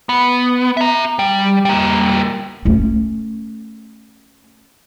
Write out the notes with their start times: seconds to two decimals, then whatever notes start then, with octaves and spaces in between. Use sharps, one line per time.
0.09 B3
0.77 E5 A#5
1.19 G3
1.65 G3 A#3
2.65 A3 C#4